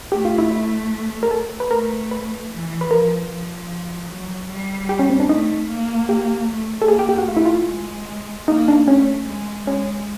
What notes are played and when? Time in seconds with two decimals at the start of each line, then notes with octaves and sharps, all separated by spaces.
0.12 A3 G4
0.25 F4
0.38 E4
0.51 E4
1.23 A#4
1.31 A4
1.60 B4
1.71 A3 A#4
2.11 B4
2.50 E3
2.81 B4
2.91 F3 A#4
3.31 F3
4.10 F#3
4.50 G3
4.89 G4
4.99 C#4
5.10 C4
5.20 D4
5.29 A3 D#4
5.70 A#3
6.09 G4
6.49 A3
6.82 A4
6.88 A#3 G#4
6.99 G4
7.09 G4
7.18 F#4
7.28 A3 F4
7.37 E4
7.46 F4
7.69 G#3
8.48 A#3 D#4
8.68 D4
8.87 A3 C#4
9.27 G#3
9.67 G#3 C#4